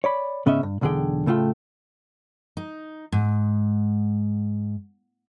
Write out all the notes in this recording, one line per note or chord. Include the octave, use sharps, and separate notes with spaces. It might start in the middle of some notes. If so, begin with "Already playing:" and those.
C#5 D5 B5
G#2 C#3 B3 C#4 D#5 E5
G2
B1 E2 D3 D4 G#4 G5
A2 C#3 A3 F4 G5
D#4
G#2